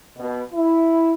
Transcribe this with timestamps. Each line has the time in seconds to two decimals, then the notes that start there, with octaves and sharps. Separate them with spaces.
0.18 B2
0.53 E4